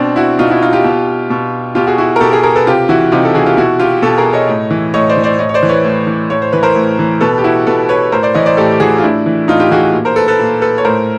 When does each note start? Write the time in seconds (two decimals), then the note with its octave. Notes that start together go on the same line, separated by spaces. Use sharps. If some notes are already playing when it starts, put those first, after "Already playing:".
Already playing: B2 C4 D4
0.16 E4 F#4
0.39 B2 D#4 F4
0.50 E4 F#4
0.62 D#4 F4
0.73 F4 G4
0.84 B2
1.30 B2
1.75 B2 F4 G4
1.87 F#4 G#4
1.98 E4 F#4
2.16 A#4
2.20 B2 G4 A4
2.32 G#4 A#4
2.43 G#4 A#4
2.56 A4 B4
2.67 C3 F4 G4
2.89 E3 E4 F#4
3.12 C3 D#4 F4
3.25 A4
3.34 E3 F#4 G#4
3.46 F4 G4
3.57 B2 E4 F#4
3.79 F4 G4
4.02 B2 G4 A4
4.18 G#4 A#4
4.33 C#5 D#5
4.49 A2
4.71 E3
4.94 A2 C#5 D#5
5.09 C5 D5
5.17 E3
5.24 C5 D5
5.39 A2 C#5 D#5
5.49 C#5
5.54 C5 D5
5.63 E3
5.69 B4 C#5
5.85 A2
6.07 E3
6.30 A2 C#5
6.42 C5
6.52 E3 B4
6.63 A#4 C5
6.75 A2
6.99 E3
7.21 B2 A4 B4
7.38 G4
7.44 E4 F#4
7.66 B2 A4 B4
7.89 B4 C#5
8.12 A2 A#4 C5
8.23 C5 D5
8.34 E3 C#5 D#5
8.46 C5 D5
8.57 A2 G4 A4
8.71 G4
8.80 E3 F#4 G#4
8.98 F4
9.02 A2 D4 E4
9.26 E3
9.48 A2 D#4 F4
9.59 F4 G4
9.71 E3 F#4 G#4
9.93 A#2
10.05 A#4 C5
10.16 A4 B4
10.28 A4 B4
10.39 A#2
10.61 A4 B4
10.78 C#5
10.85 A2 A#4 C5